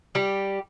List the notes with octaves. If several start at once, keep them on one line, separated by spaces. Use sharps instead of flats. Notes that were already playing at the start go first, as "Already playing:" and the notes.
G3 G4